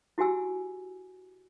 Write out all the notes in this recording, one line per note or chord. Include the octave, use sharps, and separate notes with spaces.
E4 F#4 G4 G#5 E6